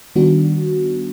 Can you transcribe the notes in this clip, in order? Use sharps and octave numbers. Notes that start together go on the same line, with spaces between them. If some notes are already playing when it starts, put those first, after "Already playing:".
D#3 G3 B3 D4 F#4